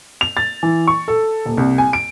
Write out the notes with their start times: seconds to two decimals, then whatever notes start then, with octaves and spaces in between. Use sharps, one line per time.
0.21 F7
0.37 A6
0.63 E3
0.87 C#6
1.08 A4
1.45 D#1
1.57 C2
1.78 G#5
1.93 D7